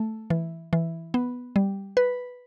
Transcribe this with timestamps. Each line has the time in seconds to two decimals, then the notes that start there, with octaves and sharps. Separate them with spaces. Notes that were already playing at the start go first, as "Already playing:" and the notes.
Already playing: A3
0.30 E3
0.73 E3
1.14 B3
1.56 G3
1.97 B4